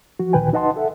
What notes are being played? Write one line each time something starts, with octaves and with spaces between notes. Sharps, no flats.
F3 F#4
D2 A#2 D#3 B4 G5 G#5
D#4 B4 D#5 F#5 A5 C6
A4 E5 F#5